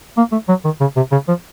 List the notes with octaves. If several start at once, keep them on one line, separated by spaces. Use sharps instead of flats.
A#3
A3
F#3
D#3
C#3
C3
C#3
F3